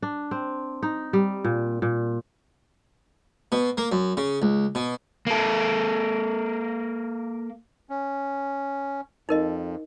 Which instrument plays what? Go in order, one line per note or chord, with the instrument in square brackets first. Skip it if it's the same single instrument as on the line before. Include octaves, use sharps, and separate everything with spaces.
[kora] D4
C4
D#4
G3
A#2
A#2
[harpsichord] B2
A#3
F#2
C#3
C#2
B2
[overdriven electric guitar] A#3 A4
[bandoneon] C#4
[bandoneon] F2 [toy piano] D#4 A#4 D#5